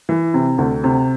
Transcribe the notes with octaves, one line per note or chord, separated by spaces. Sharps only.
E3
C3
D2
C3